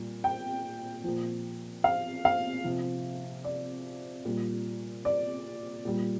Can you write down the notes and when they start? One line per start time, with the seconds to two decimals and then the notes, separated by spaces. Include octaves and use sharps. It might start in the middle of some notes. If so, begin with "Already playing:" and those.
Already playing: A#2 G3
0.24 G5
1.04 A#2 F3
1.84 F5
2.25 F5
2.64 C3 F3
3.44 D5
4.25 A#2 G3
5.05 D5
5.85 A#2 G3